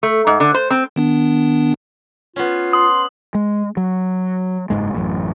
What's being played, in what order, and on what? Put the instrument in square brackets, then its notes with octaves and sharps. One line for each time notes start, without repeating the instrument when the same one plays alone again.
[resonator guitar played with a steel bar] A3
G#2
D3
C5
C4
[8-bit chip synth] D#3 B3 D4
[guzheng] B3 C#4 [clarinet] F4
[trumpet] C6 [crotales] D#6
[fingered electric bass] G#3
F#3
F#1 E2 G#2 G#3
A1 F#2